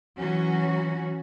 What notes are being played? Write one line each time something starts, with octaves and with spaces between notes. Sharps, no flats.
E3 F#3 C#4 F#4